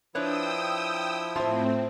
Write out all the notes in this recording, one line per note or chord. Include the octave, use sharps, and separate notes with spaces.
F3 D4 E4 B4 C#5 G5 D#6 E6
A2 C4 F4 C5 E5 A5